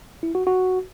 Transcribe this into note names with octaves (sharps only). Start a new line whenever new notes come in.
E4
F#4
F#4